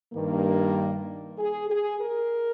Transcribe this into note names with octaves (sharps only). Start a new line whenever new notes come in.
G2 D#3 A#3
G#4
G#4
A#4